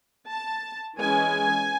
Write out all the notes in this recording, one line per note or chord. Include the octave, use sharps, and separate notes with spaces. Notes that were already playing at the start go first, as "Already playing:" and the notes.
A5
E3 G#3 C#4 G#5